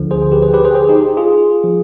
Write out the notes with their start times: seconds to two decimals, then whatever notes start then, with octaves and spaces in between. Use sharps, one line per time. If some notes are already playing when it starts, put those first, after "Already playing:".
Already playing: D2 D3 F3
0.11 G#4 C5
0.22 G#4
0.32 G4 B4
0.42 G#4 C5
0.54 G4 B4
0.65 G#4 C5
0.75 G#4 C5
0.89 D#4 G4
1.17 F4 G#4
1.63 F3